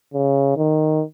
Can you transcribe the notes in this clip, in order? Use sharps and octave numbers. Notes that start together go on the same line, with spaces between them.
C#3
D#3